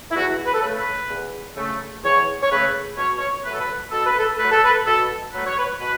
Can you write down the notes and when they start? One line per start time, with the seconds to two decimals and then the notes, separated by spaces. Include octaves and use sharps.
0.11 E4
0.15 E2 F#4
0.46 B4
0.54 A4
0.62 C#3 A3 B4
0.78 B4
1.10 E2
1.56 C#3 A3
2.04 E2 C#5
2.42 C#5
2.51 C#3 A3 B4
2.98 B2 C#5
3.19 C#5
3.44 A3 B4
3.49 F#3 A4
3.60 B4
3.91 B2 A4
4.06 B4
4.19 A4
4.38 F#3 A3 B4
4.51 A4
4.65 B4
4.86 B2 A4
5.33 F#3 A3 B4
5.46 C#5
5.58 B4
5.80 B2 B4